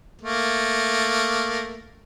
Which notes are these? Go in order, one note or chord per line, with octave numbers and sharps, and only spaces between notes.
A3 A#3